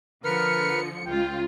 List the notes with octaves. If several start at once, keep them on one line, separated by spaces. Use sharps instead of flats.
D3 F3 A#4 B4 F6 C#7
C#2 F4 G5